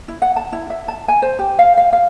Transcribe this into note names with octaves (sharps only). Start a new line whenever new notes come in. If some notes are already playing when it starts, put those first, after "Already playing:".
E4
F#5
A5
E4
E5
A5
G#5
C5
G4
F5
F5
F5